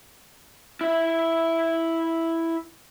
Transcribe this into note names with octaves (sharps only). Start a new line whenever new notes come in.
E4 E5